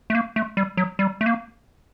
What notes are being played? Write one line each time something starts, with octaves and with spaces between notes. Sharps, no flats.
A3
A#3
A3
G3
F#3
G3
A3
A#3